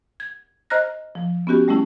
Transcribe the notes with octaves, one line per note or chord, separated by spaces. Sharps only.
G#6
C5 D#5 A#5 F6 F#6 A#6
F3
B3 C#4 F#4 G4
G3 A3 C#4 E4